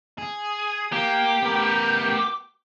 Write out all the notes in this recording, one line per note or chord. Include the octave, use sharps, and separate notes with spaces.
G#4
A#3 G4
B3 A#4